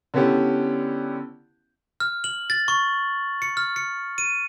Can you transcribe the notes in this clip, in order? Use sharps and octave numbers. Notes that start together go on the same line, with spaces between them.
D3 B3 C#4 E4 G4
F6
F#7
A6
C#6
C#7
F6
C#7
D#7